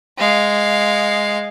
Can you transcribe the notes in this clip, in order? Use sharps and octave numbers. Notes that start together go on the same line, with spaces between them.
G#3 F5